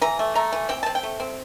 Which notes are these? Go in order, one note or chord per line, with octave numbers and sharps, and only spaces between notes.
E3 A#5
A3
A3 A#5
E3
C4 G5
C4 A5
G5
A3
C4